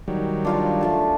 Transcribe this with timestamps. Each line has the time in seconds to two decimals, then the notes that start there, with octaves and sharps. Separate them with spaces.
0.08 D#3 F#3 G3
0.45 D4 F4 F5
0.81 A3 F4 A5